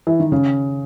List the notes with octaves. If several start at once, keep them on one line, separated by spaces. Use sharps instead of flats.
E3
D#3
C#3